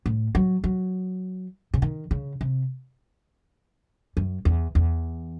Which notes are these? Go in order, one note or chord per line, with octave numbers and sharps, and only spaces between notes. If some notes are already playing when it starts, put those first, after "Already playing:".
A2
F#3
F#3
C#3
D#3
C#3
C3
F#2
E2
E2